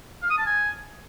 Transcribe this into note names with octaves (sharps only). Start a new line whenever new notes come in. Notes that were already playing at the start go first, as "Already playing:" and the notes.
F5
D#6
A5
G#5